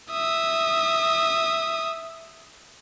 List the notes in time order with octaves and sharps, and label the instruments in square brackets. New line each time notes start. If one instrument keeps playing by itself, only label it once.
[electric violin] E5 D#6